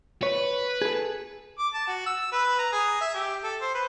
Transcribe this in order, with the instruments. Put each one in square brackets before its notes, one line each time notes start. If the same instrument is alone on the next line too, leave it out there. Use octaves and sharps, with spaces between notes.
[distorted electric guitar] B4 [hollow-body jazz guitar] C#5
[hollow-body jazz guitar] G#4 A4
[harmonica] D6
A5
F#4
E6
B4
A#5
G#4
E5
G4
A4
C5
B4